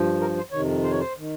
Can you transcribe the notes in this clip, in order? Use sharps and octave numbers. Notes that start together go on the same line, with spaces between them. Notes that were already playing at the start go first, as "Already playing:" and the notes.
Already playing: G2 F3
A#4
C5
F2 C3 D#3 C#5
C5
C#5
C5
D#3